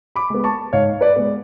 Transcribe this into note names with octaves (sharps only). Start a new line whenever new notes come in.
B5 D6
G#3 B3
A5 C#6
G#2 C#5 F5
B4 D5
G#3 B3